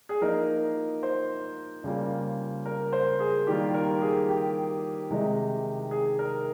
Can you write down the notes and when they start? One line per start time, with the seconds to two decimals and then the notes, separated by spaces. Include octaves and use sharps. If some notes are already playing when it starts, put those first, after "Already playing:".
0.09 G#4
0.21 F3 A#3 D#4 A#4
1.03 C5
1.84 C#3 G3 A#3 F4
2.65 A#4
2.93 C5
3.20 G#4
3.47 D#3 G3 A#3 F4 G4
3.74 A#4
4.02 G#4
4.29 G4
5.10 C3 D#3 G#3 D#4
5.91 G#4
6.19 A#4